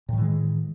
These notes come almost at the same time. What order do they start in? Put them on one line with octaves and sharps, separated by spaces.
A2 D#3 E3 G#3